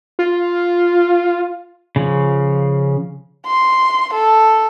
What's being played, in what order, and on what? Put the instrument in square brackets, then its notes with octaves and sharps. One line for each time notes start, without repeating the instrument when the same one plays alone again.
[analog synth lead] F4
[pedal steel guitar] C#3 F3
[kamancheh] C6
A4